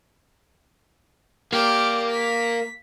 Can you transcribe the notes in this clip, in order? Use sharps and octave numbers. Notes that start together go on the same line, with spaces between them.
A#3 G4 D5
B6